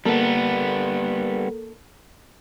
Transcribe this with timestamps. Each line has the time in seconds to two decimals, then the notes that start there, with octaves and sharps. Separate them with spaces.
0.05 G3 A#3 B3 A4 A#4